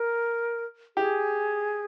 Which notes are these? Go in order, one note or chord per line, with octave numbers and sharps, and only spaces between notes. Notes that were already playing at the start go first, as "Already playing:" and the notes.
Already playing: A#4
G4 G#4